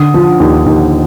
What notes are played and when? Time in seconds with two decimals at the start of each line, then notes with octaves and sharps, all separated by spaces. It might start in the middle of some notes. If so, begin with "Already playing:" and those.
Already playing: D3 D#6
0.14 F3
0.40 D#2
0.66 D#2